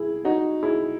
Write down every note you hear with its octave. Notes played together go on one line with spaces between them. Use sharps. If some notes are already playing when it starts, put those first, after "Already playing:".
Already playing: E4 G#4
D#4 F#4
E4 G#4